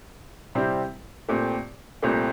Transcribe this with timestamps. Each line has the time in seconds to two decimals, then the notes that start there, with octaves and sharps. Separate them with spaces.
0.55 C3 G3 C4 E4 G4
1.29 A#2 A3 C4 G4
2.02 C2 A#2 A3 C4 G4